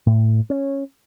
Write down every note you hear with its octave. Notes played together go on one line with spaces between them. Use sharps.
A2
C#4